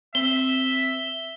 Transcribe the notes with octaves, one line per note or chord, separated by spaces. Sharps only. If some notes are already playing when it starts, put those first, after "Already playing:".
C4 E5 G7